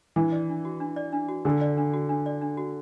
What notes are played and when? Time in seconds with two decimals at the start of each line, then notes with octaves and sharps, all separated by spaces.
0.16 E3 D4
0.32 D5
0.49 D4
0.65 F#4
0.80 D4
0.96 D5
1.12 D4
1.28 F#4
1.45 D3 D4
1.61 D5
1.77 D4
1.93 F#4
2.09 D4
2.26 D5
2.41 D4
2.57 F#4